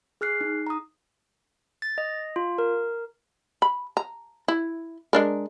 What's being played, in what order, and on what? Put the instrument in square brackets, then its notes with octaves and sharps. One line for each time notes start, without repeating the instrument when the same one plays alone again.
[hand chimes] G#4 F6 F#6 C7
D#4
A#5 D#6
[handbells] A6
D#5
F4
A#4
[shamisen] B5
A#5
E4
G#3 D4 A#4